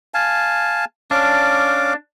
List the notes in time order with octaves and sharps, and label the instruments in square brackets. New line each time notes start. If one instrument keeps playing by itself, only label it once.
[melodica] F5 G#5 A5
[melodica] C#4 F5 D6 [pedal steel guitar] D4